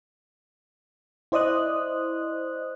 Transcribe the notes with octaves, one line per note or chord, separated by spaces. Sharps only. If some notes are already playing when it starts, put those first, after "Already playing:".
E4 C5 D5 D#5 D#6 F#6